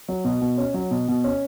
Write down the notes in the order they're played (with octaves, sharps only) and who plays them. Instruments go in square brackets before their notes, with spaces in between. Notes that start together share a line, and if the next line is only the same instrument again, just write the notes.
[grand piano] F#3
B2
B2
C#4
F#3
B2
B2
C#4